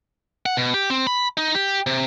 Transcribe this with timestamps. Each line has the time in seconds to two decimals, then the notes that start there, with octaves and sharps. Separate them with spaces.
0.46 F#5
0.57 B2
0.74 G4
0.90 C4
1.07 B5
1.37 D#4
1.55 G4
1.86 C3